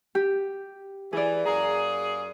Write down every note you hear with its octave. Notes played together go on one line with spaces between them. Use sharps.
G4
E3 G#4 D5
F#2 A#3 G#4 A#5